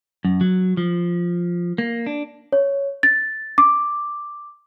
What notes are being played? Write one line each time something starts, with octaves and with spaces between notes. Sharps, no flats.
F#2
F#3
F3
A#3
D4
C#5
A6
D6